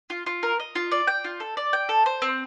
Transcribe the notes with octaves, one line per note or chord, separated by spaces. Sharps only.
F4
F4
A#4
D#5
F4
D5
G5
F4
A4
D5
G5
A4
C5
C4